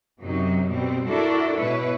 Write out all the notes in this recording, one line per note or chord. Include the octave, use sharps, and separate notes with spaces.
F#2 C3 F#3 D#4
B2 G3 C4
D4 E4 F#4 A4 A#4 D5
G#2 B2 E4 B4 C#5